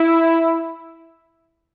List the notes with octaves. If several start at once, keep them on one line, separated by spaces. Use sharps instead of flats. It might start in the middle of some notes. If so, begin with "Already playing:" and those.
Already playing: E4